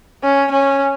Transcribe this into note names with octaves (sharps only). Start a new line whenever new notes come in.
C#4
C#4